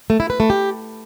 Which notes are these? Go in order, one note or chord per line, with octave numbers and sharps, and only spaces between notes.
A3
E4
B4
A3
G4